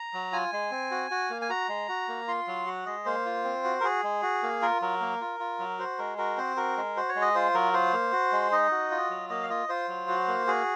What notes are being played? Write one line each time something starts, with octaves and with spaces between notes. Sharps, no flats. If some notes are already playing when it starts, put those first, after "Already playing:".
Already playing: A#5
F#3
F4 G#5
G#3
C4
F#4
F#4
A#3
G#5
F#4 A#5
G#3
F#4
A#3
F4 C6
F#3
F#4 F#5
G#3 D#5
A#3 C5
F4
C4
F#4
A#4
F#4 G#4
G#3
F#4
A#3
F4 A#4
F#3 A#4
A#3
F4
F4
F#3
F#4 C5
G#3 A#4
F#4 A#4
C4 C5
F#4 A#4
G#3
F#4 C5
C#5
G#3
D#5
F4 C5
F#3 A#4
F4 C5
A#3
F#4
G#3
D#4 D#5
F#4
F4
F#3
A#3 D#5
F5
F4 D#5
F4 C5
F#3
F#4
A#3
F#4 G#4